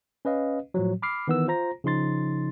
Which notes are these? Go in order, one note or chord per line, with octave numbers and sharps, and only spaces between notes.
C#4 B4 D#5 F5
A2 F3 F#3
B5 D6 F6 C7
D#3 E3 B3 B4 E6
F4 C5 A#5 A#6
C#3 F3 D#4 C6 A6